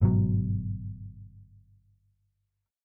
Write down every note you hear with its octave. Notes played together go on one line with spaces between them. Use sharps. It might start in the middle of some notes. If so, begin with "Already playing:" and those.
G1 G#2 B2 F#3